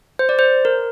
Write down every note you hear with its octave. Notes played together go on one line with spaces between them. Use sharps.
C5
D5
C5
A#4